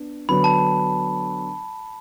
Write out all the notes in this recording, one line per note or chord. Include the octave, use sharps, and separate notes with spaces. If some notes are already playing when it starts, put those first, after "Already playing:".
Already playing: B3 D4
D3 F#3 B3 D4 B5
A5